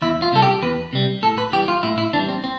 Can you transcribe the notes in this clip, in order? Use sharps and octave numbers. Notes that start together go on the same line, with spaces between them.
E2 E4
F4
C3 G3 A4
G4
E2 B4
C3 G3
A2 A4
B4
E3 G3 G4
F4
A2 E4
E4
E3 G3 D4
C4
C4